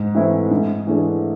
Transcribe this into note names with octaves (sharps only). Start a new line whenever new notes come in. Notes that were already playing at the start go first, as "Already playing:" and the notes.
Already playing: G#2
E3 A3 C4 E4
G#2
E3 A3 D4 G#4